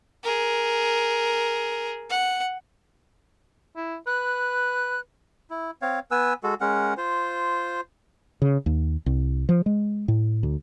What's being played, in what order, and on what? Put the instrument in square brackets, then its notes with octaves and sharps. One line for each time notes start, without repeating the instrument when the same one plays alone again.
[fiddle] G#4 A#4
F#5
[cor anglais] E4
[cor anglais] B4 [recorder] F#6
[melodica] E4
C4 C#5 F5
B3 B4 G#5 E6
G#3 F#4 A4
G#3 C#4 A#4 F#5
F4 C5
[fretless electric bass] C#3
D#2
C2
F3
G#3
A2
D2